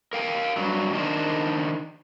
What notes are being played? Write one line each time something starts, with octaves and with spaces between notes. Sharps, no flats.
A#4 F5 G5
G2 F#3
D#3 D4 A#4 C5